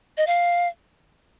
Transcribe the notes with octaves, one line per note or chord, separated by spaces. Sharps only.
D#5
F5